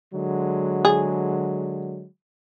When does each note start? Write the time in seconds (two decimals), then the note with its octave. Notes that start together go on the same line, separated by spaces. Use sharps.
0.13 D3 F#3 G#3
0.85 G#4